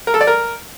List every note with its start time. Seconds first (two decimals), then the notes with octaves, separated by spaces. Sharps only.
0.07 A#4
0.14 A4
0.21 D5
0.27 A#4